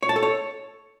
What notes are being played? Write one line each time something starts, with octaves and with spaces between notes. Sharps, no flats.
C#5
A5
A4
C#5